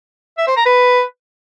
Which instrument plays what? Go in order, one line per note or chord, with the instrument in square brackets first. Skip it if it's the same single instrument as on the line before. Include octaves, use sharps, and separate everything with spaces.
[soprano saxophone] E5
C5
A#5
B4